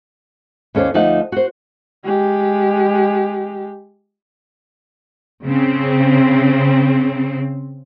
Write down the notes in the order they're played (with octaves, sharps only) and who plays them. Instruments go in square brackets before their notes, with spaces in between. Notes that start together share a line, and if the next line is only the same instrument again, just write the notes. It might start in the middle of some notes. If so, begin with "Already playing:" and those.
[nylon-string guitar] D#2 C#4 A4 C5 D5
D2 F3 A3 D#4 F#5 A5
F#4 C5
[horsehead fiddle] G#3 G4
[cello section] C#3 C4